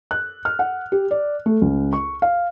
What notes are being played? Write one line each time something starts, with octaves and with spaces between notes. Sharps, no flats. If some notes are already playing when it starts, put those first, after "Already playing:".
F#6
F6
F#5
G4
D5
A3
C#2
C#6
F5